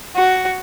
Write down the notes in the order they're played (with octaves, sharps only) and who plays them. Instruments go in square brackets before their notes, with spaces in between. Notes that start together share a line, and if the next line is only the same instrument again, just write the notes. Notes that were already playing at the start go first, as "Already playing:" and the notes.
[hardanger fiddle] F#4